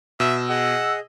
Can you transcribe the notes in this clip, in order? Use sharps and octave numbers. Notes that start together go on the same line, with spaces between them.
B2 E5 E6
G#4 D#5 F#5